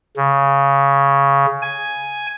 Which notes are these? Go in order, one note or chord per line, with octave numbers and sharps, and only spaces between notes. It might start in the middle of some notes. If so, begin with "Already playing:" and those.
C#3
G#5